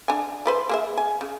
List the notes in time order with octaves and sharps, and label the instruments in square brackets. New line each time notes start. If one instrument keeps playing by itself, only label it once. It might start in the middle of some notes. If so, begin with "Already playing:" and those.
[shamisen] D4 G#5
E3 B4 C5
A#3 G#4 E5
G#5
C#3